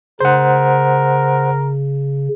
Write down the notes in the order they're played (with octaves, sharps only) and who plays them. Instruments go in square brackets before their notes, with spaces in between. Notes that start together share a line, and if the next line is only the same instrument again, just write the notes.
[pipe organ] C#3 [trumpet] A#4 [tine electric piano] C5 F#5